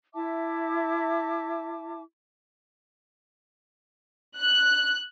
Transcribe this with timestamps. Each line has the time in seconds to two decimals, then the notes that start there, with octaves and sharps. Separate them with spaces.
0.14 E4 E5 A5 D6
4.40 F#6